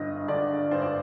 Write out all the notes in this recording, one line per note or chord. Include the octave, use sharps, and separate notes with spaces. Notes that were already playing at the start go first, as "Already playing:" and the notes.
Already playing: G1 G2 D#5
D3 D5
G2 C5
D5